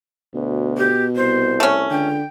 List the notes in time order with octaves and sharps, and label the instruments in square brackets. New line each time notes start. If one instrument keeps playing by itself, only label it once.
[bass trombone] D2 [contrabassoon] B2
[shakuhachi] G4
[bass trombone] C2 [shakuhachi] C5
[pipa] A3 C#4
[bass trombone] C#2 [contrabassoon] D3 [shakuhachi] G5